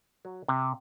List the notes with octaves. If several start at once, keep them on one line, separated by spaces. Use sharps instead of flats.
F#3
C3